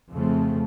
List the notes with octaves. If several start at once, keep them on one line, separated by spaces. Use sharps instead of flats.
F2 C#3 F3 A3 C4